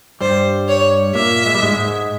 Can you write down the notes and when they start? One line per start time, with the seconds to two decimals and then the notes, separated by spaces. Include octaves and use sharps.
0.21 G2 G3 C5
0.68 C#5
1.15 A#2 A#3 E5
1.46 G#3
1.54 G3
1.62 G#2 G#3
1.78 G#2 G#3